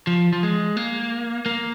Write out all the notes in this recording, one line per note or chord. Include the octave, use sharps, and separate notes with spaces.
F3
F3
G#3
A#3
A#3